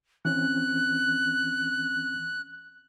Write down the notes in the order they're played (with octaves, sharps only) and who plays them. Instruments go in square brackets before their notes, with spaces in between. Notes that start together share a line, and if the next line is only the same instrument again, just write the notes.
[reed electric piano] E3 C4 C#4 [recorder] F#6